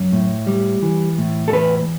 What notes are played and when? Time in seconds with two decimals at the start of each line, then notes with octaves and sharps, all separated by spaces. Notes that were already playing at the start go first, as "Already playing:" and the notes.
Already playing: F#2
0.12 A2
0.47 G3
0.82 E3
1.18 A2
1.48 A4
1.53 E2 B4